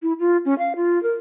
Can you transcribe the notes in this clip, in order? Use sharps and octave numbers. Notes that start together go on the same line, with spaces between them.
E4
F4
C#4
F5
F4
A#4